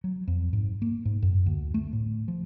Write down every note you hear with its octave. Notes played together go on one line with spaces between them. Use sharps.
F#3
F2
G#2
A#3
G#2
F#2
D2
A3
A2
F3